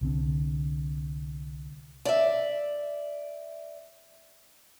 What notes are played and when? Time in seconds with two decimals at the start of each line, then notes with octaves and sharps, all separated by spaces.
0.01 C2 D3 C4
2.05 D5 E5